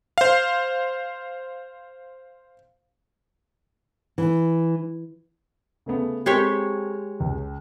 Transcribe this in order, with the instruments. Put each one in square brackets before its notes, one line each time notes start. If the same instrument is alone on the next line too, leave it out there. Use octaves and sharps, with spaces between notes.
[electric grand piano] C5 F5
[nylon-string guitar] E3
[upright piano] C#3 A3 B3
[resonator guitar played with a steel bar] G#3 G4 C#5 [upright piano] C4 A4 A#4
[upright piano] C#2